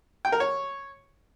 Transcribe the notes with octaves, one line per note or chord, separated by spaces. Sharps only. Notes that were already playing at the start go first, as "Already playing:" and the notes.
G5
A#4
C#5